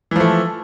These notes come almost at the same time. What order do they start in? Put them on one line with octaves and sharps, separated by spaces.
E3 F3 A3